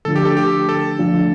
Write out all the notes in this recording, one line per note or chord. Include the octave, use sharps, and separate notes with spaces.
D3 F3 A3 D4 F4 A4
G4
A4
G4
A4
D3 F3 A3 D4 F4